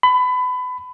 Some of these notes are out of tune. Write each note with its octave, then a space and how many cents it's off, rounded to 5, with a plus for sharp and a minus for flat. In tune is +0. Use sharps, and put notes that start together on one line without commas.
B5 +25